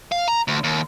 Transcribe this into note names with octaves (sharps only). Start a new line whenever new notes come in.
F5
A#5
D2
D#2